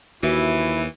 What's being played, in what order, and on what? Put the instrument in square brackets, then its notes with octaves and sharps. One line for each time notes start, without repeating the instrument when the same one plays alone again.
[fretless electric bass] D#2 [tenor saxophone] E3 [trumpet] E4 [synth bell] F#4 E5